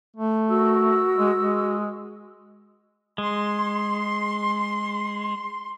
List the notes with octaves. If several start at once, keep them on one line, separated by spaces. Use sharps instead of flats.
A3
F#4 A#4 E6
G#3
G#3
G#3 C6